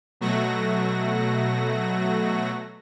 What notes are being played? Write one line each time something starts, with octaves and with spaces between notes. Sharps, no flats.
B2 F#3 A3 F#4 A#6